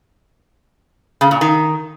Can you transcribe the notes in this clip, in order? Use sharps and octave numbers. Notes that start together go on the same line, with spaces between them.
C#3
A#2
D#3